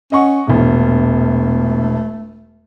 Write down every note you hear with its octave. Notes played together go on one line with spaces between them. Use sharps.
C#4 D#5 F#5 C#6
E1 A#1 E2 A3 B3